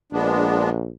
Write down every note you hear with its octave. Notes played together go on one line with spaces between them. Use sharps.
A#1 G#3 B3 D4